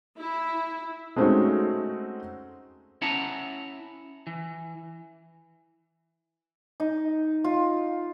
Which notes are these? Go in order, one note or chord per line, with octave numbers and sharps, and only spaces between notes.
E4
G#3 A3 C4 C#4 D#4 F#4
C#4 E4 E5 F#5 A5 A#5
E3
D#4
F4